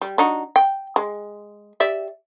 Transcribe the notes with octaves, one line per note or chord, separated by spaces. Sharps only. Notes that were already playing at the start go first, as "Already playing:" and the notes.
G3
D4 D#4 F#4
G5
G#3
G4 D5 E5